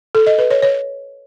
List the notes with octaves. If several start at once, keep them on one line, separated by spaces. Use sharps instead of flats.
A4
D#5
B4
C#5
C#5